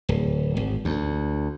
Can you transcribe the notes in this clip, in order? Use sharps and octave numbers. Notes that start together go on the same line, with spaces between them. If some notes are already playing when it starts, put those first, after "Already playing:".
D1
G#1
D2